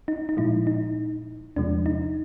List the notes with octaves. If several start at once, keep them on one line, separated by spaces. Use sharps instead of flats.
D#4
D#4
A#2 F3 G#3 E4
D#4
E2 C3 F3 G#3 D4
D#4